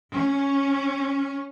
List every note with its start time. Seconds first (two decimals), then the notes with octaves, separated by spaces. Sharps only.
0.12 C#4